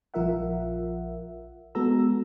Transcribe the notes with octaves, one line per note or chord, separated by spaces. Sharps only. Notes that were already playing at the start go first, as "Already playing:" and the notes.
A#1 F3 F4 A#4 E5 F#5
G#3 B3 F#4 A4 A#5 E6